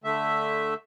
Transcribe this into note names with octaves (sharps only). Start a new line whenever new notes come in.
D3 A3 E5